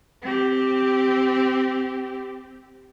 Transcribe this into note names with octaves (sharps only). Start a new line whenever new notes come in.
C4 G4